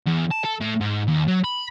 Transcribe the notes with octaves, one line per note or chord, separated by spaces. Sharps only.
E2
A5
A4
A2
G#2
D#2
F#3
B5